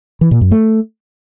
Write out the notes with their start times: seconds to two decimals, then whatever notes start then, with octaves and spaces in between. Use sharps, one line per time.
0.21 E3
0.31 A#2
0.41 F#2
0.51 A3